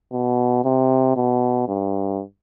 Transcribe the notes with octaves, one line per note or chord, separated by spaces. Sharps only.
B2
C3
B2
G2